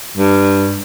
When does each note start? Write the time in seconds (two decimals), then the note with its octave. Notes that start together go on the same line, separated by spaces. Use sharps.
0.17 G2